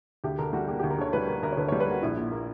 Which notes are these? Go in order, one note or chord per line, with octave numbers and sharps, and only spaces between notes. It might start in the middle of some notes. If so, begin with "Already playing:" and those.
D2 G4
D3 A#4
G3 F#4
A#3 G4
G4
D2
A#4
D3 C#5
G3 B4
A#3 A#4
D2 A#4
C#5
D3 B4
C#5
G3
B4
A#3 F#4
A#1 E4
A#2
A#3